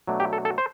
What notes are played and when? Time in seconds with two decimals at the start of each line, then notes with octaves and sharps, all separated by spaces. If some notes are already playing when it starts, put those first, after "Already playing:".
0.07 B2 F#3 A3 D4
0.20 G4
0.33 A4
0.45 A4
0.58 C5